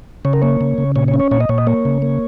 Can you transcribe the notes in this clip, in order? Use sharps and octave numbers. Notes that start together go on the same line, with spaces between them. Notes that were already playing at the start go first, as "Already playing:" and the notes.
C#3 C#5
A#4
A#3 C#5
C#3
C#3
A#2 C#5
C#5
C#4
C#5
A#2 C#5
D#5
A#2 C#5
D#5
A#3 C#5
C#3
A#3